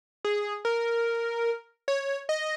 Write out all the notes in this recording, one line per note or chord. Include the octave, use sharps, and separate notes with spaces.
G#4
A#4
C#5
D#5